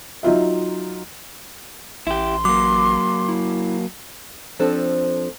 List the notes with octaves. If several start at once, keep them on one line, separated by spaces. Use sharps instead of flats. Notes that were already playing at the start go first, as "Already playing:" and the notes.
F#3 D#4 F4 E5
A1 E4 G4 C6
F#3 A#3 D6
E4
F3 C4 D4 A4